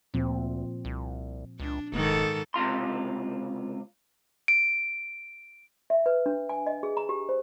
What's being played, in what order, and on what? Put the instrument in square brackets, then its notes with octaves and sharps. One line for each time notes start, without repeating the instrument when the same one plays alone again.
[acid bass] D2 [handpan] A#2 F3 C4
[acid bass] C2
[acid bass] C#2 [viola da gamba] D4
[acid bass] E1 [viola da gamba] G#2 D#3 A4
[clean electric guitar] C#2 C3 F4 C6
[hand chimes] D7
[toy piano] E5
B4
D4
G#5
D#5
G#4
A#5
G4
C5